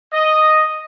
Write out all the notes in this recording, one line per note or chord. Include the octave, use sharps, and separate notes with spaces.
D#5